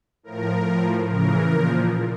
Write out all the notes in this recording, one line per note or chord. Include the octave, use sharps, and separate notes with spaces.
A2 F3 A#4
A2 F3
C#3 E3 A#4
A#2 F3